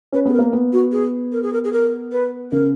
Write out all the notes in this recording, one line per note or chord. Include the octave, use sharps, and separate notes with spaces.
C#4 B4
B3 G#4
A#4
A#3
B3
F#4
G#4
A#4
G#4
A#4
G#4
A#4
B4
C#3 A#4